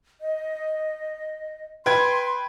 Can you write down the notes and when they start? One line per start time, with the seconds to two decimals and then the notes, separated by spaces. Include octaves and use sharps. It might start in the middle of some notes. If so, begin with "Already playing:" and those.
0.21 D#5
1.86 B4 G5 C6 G#6